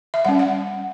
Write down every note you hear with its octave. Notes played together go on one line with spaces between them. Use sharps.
E5
G3 C#4 F#5
F#5